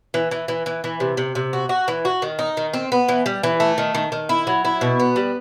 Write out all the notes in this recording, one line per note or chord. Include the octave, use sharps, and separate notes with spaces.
E3
E3
E3
E3
E3
C3
C3
C3
F#4
F#4
E3
F#4
D#3
D#4
D#3
C4
B3
E3
G3
E3
A3
D#3
D#3
D#3
E4
F#3
E4
B2
B3
G3